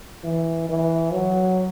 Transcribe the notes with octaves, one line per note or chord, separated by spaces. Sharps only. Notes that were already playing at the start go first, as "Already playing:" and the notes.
E3
E3
F#3